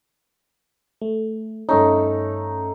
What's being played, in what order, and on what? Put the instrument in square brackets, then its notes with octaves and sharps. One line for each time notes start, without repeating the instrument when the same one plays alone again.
[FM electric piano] A3
[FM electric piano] G2 C#4 [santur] A3 D#4